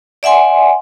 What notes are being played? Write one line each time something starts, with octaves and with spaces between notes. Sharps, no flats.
D5 E5 F#5 G#5 C6